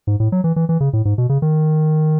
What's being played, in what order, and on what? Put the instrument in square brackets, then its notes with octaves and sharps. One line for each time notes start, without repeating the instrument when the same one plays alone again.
[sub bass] G#2
A2
F#3
E3
E3
E3
C#3
A2
G#2
B2
C#3
D#3